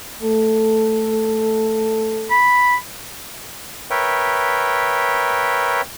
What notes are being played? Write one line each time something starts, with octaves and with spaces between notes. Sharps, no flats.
A3 A4
B5
A#4 B4 C#5 E5 G5